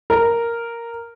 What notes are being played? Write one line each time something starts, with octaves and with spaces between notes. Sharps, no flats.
A#4